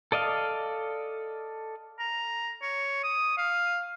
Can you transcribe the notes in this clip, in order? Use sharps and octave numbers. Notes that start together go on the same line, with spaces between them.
A4 D5 D#5 F5
A#5
C#5
D#6
F5